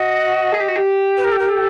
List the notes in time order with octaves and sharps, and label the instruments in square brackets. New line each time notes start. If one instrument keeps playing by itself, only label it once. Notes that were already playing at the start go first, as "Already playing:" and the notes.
Already playing: [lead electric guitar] F#4 [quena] D#5
[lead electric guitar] G#4
G4
F#4
G4
[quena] B4
A#4
A4
A#4
A4